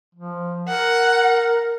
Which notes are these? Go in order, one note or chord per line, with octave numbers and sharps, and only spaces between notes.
F3
A#4 F#5